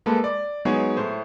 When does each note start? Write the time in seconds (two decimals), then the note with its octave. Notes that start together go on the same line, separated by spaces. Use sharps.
0.06 G#3 A#3 A4 B4
0.24 D5
0.65 F#3 G#3 B3 D#4 G#4 C#5
0.97 A2 A3 C5